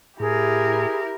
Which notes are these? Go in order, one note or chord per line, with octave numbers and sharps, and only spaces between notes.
A2 E4 G4 G#4 A#4